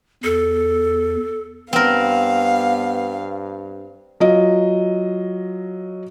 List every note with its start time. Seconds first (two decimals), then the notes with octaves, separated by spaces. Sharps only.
0.24 E2 A4
1.73 G2 B3 C4 A#4 F5
4.20 F#3 F4 D#5